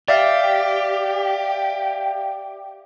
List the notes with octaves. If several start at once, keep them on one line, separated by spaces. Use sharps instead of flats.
G4 D5 E5 F5